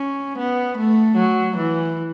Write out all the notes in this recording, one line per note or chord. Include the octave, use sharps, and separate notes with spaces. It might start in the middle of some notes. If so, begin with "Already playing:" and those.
Already playing: C#4
B3
A3
F#3
E3